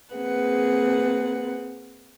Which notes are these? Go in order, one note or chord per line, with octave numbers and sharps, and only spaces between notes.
A#3 C4 G#4 B4 F#5